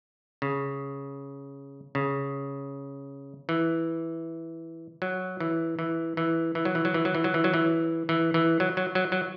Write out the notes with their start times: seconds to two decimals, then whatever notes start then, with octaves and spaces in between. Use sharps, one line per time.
0.42 C#3
1.95 C#3
3.49 E3
5.02 F#3
5.40 E3
5.79 E3
6.17 E3
6.55 E3
6.65 F#3
6.75 E3
6.85 F#3
6.94 E3
7.05 F#3
7.15 E3
7.24 F#3
7.34 E3
7.44 F#3
7.54 E3
8.09 E3
8.34 E3
8.60 F#3
8.77 F#3
8.95 F#3
9.12 F#3